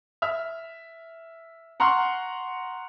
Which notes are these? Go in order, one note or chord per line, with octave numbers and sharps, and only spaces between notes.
E5 F6
F#5 A#5 C6 C#6 F6